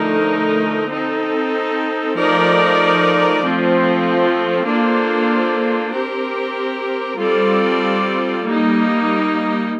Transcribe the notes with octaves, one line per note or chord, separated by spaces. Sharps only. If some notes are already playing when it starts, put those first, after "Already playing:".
Already playing: D3 F3 A3 D#4 A#4
C4 D#4 A4
F3 A3 D#4 A#4 D5
F3 A3 C4 F4
A#3 D4 F4 A4 C5
C4 G4 A#4
G3 C4 F4 A4 D5
G3 A#3 D#4